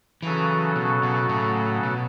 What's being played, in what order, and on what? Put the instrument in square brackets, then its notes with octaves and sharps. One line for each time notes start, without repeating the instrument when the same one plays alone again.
[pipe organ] C#3 F#3 C#4 F#4 A4 [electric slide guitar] E3
[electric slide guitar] B2
B2
A2
B2